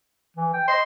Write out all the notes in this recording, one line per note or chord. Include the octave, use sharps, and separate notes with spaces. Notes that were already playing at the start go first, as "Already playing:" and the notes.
E3
G5
D#5 C6